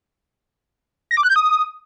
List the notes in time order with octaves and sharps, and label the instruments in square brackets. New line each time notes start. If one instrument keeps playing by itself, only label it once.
[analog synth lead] A#6
D6
F#6
G6
D#6